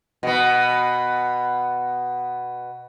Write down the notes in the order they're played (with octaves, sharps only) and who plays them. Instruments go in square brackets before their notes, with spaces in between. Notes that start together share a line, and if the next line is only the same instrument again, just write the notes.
[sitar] B2 B3